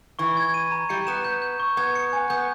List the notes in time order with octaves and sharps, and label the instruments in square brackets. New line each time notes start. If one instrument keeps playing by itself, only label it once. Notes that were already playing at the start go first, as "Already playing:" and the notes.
[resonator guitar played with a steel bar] E3 [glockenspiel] C#6
[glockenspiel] G#6
D#7
A#5
[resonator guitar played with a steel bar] G3 [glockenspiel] C#7
[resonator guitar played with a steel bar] B3 [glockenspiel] E7
[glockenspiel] G6
G6
C#6
[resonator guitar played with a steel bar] B3 [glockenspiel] G#6
[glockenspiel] C#7
G#5
[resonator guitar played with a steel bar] B3 [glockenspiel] G6